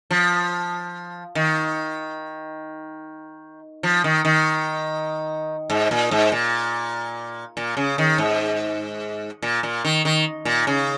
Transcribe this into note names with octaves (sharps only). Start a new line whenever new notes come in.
F3
D#3
F3
D#3
D#3
G#2
A#2
G#2
A#2
A#2
C#3
D#3
G#2
A#2
A#2
D#3
D#3
A#2
C#3